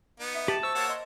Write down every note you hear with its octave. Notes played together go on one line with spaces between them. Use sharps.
B3 D#4
E5
G4 A5 A6 D#7 F#7
C5 C#6 E6
A#3 C#5 F#5 A6
D#5 C6